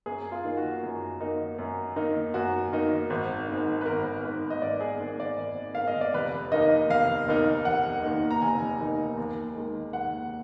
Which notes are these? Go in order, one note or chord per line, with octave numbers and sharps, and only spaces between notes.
F#2 G#4
F4
D#3 A#3 D#4
F#4
F#2
D#3 A#3 D#4
F#2
D#3 A#3 D#4
F#2 F#4
D#3 A#3 D#4
G#1
G#2 D#3
B4
G#1 A#4
G#2 D#3 B4
D#5
G#1 D5
G#4
G#2 D#3
D5
G#1
G#2 D#3 F5
D#5
D5
F1 B4
D#2 D#3 A#3 D#4 D#5
F1 F5
D#2 D#3 A#3 D#4
F1 F#5
D#2 D#3 A#3 D#4
A#5
F1 G#5
D#2 D#3 A#3 D#4
D#2
D#3 G#3
D#2 F#5